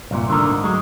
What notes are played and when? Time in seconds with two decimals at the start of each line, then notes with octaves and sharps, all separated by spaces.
0.11 C2 G2 A#2
0.29 D3 D#3 A#4
0.51 G#2
0.64 F#3 G#3